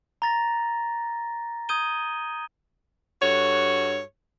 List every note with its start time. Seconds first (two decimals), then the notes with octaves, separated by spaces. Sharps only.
0.22 A#5 A6 A#6
1.69 D#6 G6 G#6 D#7 G7
3.22 G2 F#4 A4 C#5